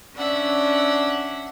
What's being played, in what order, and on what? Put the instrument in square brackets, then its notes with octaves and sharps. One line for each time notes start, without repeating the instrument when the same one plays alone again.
[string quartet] C#4 D4 E5 F#5